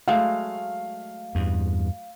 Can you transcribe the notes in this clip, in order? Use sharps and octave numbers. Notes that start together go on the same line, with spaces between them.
F#3 G#3 A3 F5
E2 G2